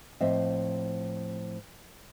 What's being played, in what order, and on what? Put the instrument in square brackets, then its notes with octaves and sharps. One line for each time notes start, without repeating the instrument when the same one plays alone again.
[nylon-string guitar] A2 F3 A#3 C4 D#5 E5